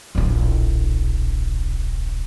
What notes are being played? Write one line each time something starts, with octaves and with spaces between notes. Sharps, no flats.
D1 A#1